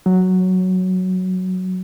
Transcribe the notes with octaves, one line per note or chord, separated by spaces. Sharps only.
F#3